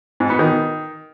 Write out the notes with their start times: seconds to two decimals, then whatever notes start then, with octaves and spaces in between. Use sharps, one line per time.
0.20 G#2
0.30 B3
0.39 D#3